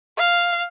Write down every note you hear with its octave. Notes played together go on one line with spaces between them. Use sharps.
F5